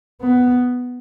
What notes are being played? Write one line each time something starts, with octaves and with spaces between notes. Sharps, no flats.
B3